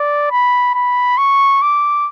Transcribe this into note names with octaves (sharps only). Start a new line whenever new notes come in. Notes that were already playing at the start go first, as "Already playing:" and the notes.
Already playing: D5
B5
B5
C#6
D6